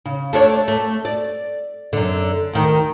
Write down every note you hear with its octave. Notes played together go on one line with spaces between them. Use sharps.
C#3
A3 D4 C#5
A3
D5
F#2 D3
D2 D#3